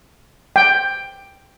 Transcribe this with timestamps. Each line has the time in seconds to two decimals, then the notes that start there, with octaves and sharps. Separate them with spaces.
0.56 G5